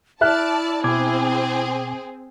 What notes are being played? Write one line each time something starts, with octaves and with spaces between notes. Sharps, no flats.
E4 D5 E5 A5 F6 F#6
B2 C4 G#4 D6 G#6